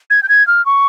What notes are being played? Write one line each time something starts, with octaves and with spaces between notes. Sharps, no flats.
G#6
G6
G#6
F6
C#6